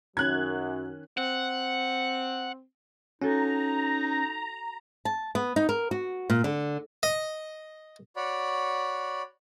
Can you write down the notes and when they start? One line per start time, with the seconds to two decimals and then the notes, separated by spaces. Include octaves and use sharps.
0.17 F#2 D#3 F#3 C#4 F#6 G#6
1.17 C4 F#5
3.22 C#4 D#4 F#4 A4 A#5 G#6
5.05 A5
5.35 B3
5.56 D#4
5.69 A#4
5.91 F#4
6.30 A#2
6.44 D3
7.03 D#5
8.16 F#4 C#5 D5 F#5 B5